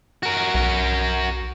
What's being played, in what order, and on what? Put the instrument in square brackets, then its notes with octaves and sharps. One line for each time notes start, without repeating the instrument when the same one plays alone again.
[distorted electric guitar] F#4 A#4
[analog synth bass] B1